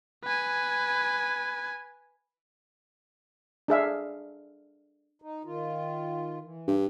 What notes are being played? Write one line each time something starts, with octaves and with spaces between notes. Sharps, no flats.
B4 G#5
D4 G#4 E5 F5
D#4
D#3 F4
E3
G2